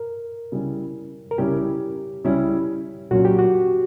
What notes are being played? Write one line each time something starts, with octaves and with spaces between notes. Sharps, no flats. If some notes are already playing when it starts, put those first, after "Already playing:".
Already playing: A#4
C#3 G3 C#4 E4
A#4
C#3 G3 C#4 E4 G4
C#3 G3 C#4 E4
A#2 F#3 A#3 C#4 F#4
G4
F#4